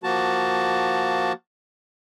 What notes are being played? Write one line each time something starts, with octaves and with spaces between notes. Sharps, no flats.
F3 A#3 F#4 A5